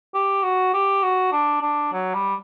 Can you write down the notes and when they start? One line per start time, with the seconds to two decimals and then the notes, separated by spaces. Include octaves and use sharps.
0.14 G4
0.43 F#4
0.74 G4
1.03 F#4
1.32 D4
1.62 D4
1.93 F#3
2.14 G3